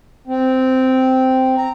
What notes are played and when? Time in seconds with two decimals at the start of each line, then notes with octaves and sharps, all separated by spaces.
0.27 C4
1.57 A#5